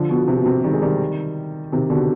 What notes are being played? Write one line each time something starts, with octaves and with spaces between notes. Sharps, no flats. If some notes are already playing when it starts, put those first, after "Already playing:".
Already playing: D3 F3
B2
C3
B2
C3
D#3 G3
G#3
D#3 G3
C3 D#3
B2 D3